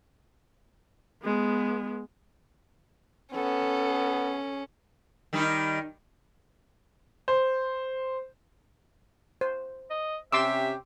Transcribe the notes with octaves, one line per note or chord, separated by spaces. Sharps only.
G#3 B3
B3 C#4 A4
D#3 G3 D#4
C5
C5
D#5
C3 C#4 G4 E5 C6 D6 E6